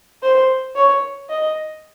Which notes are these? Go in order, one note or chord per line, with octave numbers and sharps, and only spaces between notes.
C5
C#5
D#5